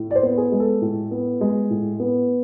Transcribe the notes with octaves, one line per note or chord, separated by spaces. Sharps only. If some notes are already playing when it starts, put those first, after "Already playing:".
Already playing: A2
D5
C5
B3
G#4
G#3
A4
A2
B3
G#3
A2
B3